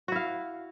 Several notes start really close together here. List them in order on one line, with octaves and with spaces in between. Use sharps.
F#4 E4 F5